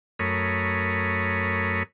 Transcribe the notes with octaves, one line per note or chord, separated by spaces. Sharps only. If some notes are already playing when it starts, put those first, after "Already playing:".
F#2 A3 A#4 C#5 B5 D#6